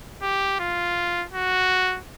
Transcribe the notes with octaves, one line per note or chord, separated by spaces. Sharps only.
G4
F4
F#4